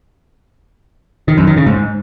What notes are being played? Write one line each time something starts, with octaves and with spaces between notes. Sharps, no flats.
D#3
F#2
D#3
C#3
G#2